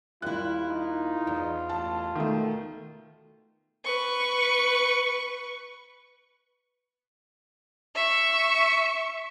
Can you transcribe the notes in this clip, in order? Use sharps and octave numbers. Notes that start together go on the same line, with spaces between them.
D#2 G3 E4 F4 F#6
D#4
E2
A1 A5
B2 D#3 A3
B4 C#6
E5 C#6